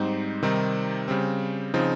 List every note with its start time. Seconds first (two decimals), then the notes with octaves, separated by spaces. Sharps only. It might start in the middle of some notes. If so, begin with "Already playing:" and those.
Already playing: G#2 G3 C4 D#4
0.42 C3 D#3 G3 C4 D#4
1.08 C#3 G3 C4
1.74 C#3 F3 C4 D#4